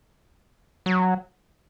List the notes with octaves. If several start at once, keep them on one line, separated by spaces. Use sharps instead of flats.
F#3